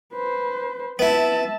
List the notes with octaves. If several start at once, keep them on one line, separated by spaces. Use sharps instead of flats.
B4 C5
B3 E4 E5 A5